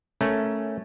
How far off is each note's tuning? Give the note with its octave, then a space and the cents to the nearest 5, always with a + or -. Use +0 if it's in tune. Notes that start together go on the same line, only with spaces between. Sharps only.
A3 +0 C#4 -5 A#4 +0